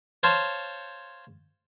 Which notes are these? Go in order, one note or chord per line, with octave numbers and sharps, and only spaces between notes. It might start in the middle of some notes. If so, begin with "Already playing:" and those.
C5 C#5 F5 A5 C#6